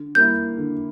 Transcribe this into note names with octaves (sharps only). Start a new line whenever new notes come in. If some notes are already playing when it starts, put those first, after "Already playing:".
Already playing: D3
G3 A#3 E4 G6
D3